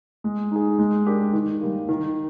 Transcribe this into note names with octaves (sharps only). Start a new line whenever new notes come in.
G#3
D#4 G#4
G#3
D4 G4 A#4
D#3
G3 A#3
D#3